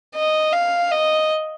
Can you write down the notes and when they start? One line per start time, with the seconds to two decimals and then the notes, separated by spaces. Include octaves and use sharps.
0.15 D#5
0.53 F5
0.91 D#5